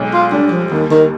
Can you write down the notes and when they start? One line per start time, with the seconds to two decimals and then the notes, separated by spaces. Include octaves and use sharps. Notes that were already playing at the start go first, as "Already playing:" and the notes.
Already playing: B1 G#3
0.13 F4
0.32 G3 D4
0.52 F3
0.71 D#2 D#3
0.91 D#3